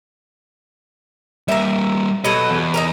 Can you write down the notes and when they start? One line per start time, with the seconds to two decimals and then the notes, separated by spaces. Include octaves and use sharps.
1.48 G3 A#3 A#4 E5
2.24 B2 F#3 A4 D#5
2.50 E2
2.74 D#4 E4 A#4